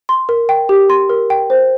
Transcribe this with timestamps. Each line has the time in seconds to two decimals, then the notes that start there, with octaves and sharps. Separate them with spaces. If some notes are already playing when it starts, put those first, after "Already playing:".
0.09 C6
0.29 A#4
0.49 G5
0.69 G4
0.90 C6
1.10 A#4
1.30 G5
1.50 C5